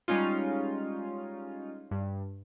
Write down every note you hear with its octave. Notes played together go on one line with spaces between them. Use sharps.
G3 G#3 C#4 D#4 F4
G2